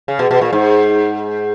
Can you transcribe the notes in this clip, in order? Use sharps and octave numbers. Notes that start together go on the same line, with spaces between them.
C#3
B2
B2
A#2
G#2